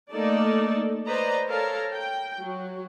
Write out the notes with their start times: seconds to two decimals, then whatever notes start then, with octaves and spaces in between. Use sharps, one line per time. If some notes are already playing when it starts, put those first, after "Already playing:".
0.11 A3 A#3 D#4 A4 D5
1.07 B4 C5 D5 D#5 A#5
1.47 A4 A#4 C#5 F5 A5 A#5
1.92 G5
2.38 F#3 F#4